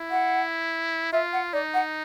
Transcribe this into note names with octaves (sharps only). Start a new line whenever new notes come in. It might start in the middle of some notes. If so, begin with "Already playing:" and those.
Already playing: E4
F#5
F4 E5
F#5
D#4 D5
F#5